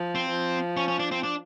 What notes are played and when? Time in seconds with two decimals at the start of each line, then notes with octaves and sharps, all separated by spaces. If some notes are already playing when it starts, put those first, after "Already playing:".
Already playing: F3
0.15 C4
0.30 F3
0.77 C#4
0.88 C#4
0.99 D4
1.11 C4
1.23 D4